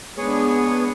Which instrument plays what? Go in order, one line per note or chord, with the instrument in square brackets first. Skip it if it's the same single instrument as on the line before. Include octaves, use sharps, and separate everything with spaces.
[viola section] G#3 B3 D4 [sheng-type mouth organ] G#4 C#5